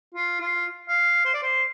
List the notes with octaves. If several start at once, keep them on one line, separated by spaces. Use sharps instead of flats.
F4
F4
F5
C5
D5
C5